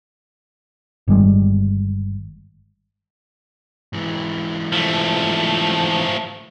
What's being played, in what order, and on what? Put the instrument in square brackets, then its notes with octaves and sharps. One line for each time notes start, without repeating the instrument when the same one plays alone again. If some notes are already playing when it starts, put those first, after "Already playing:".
[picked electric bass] G1 D#3 G3 G#3
[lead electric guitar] G#2 E3
[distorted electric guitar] F3 A3